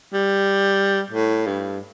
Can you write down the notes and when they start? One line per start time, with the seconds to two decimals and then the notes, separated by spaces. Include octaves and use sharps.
0.13 G3
1.11 A2
1.47 G2